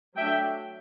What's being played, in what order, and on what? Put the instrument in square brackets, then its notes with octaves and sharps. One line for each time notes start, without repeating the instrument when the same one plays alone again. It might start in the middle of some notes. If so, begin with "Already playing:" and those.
[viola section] F#3 A3 D4 E5 G5